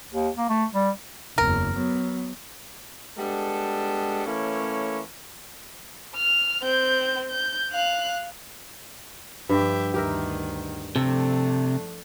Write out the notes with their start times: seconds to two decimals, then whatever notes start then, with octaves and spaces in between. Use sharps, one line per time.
0.13 D#2
0.37 A#3
0.49 A3
0.74 G3
1.38 F#1 E2 A#4
1.75 F#3 B3
3.18 G3 G#3 B3 D4 A4
4.25 E3 A3 A#3 C#4 E4 C#5
6.15 F6
6.63 C4 G6
7.30 G6
7.72 F5 F#6
9.49 G2 F3 G4 E5
9.94 D2 D#3 G4 A#4 E5
10.96 C3 F3 A3 D4 A4